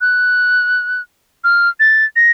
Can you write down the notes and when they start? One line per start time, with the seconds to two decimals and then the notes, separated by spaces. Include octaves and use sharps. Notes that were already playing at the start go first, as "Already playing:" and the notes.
0.01 F#6
1.44 F6
1.80 A6
2.16 A#6